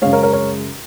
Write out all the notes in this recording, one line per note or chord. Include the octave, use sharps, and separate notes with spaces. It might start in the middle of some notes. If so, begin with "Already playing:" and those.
F#2 C#3 G#3 C#5 F5
A#4 C#5
A#4 C#5
A#4 C#5